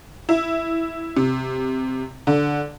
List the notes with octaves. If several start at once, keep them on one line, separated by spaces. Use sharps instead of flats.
E4
C3
D3